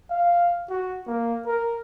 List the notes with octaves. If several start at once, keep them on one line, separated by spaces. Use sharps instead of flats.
F5
F#4
A#3
A#4